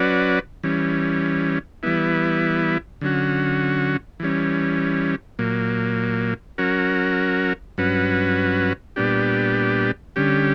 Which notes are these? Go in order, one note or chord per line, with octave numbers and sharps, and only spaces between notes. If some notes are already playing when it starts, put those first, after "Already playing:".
Already playing: F#3 C#4 F#4 B4 D5
E3 G3 C#4
E3 G3 B3 E4
D3 F#3 C#4 F#4
E3 G3 C#4
A#2 F#3 A#3
F#3 C#4 F#4 A#4
G2 F#3 C#4 F#4 B4
A#2 G3 B3 D4 G4
D3 G3 C#4 G4